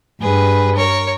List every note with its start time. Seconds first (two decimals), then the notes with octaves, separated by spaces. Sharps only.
0.21 G2 G#4 B4
0.75 A#4 C#5